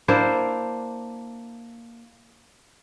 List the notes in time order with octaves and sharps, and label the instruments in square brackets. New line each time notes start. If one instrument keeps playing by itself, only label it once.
[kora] A#3 D4 E4 C5